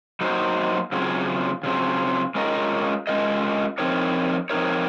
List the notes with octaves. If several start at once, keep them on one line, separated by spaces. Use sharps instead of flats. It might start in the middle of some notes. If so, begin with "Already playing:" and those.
F#3 A#3 D#4 F#4 C5
C#3 F#3 C4 F4 G#4
C#3 F#3 C4 F4 G#4
G#3 C#4 F4 A#4 D#5
G#3 C#4 F4 A#4 D#5
F3 C4 D#4 A#4 C#5
F3 C4 D#4 A#4 C#5